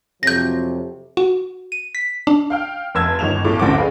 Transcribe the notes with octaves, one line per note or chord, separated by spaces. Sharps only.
F2 C3 F#3 G6 A#6
F#4
D#7
B6
D4
F5 G5 F6
F1 A5 E6 G#6
G1 D#2 D#4 E7 F7
B1 A2 A4 D6
A1 D2 E3 C4 D6
D4 G#4 B4 F5